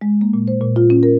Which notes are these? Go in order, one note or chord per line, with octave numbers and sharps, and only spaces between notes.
G#3
A#3
A#2
C5
A#2
F4
C#4
A#4